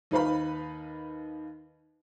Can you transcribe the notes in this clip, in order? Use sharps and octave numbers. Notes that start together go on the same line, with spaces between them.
D#2 D#4 B4 F5 B5